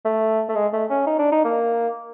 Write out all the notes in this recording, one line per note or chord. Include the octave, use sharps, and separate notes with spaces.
A3
A3
G#3
A3
C#4
D#4
D4
D#4
A#3